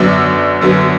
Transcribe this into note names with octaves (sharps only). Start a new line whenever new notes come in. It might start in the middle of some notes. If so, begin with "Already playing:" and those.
Already playing: F#2 D3 F#3 B3 D5
F#2 D3 F#3 B3